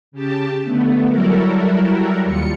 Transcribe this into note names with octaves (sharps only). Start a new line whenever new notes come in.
C#3 G4 A5
D3 A3 B3
F#3 G3 E4 F#4 A4 A#4
D#2 G3 F4 C#7